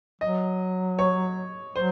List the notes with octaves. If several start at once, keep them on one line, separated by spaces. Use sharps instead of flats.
F#3 D#5
C#5
F#3 C5